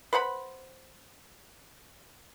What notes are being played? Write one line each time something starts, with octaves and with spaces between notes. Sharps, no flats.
B4 C5 F#5 B5